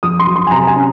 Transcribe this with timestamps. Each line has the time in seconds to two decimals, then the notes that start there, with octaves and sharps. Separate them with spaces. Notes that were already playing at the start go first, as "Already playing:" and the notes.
0.03 F2 D#6
0.19 C6
0.27 F#3
0.36 C6
0.47 G#5
0.51 C3 A#5
0.67 G#5
0.76 C#4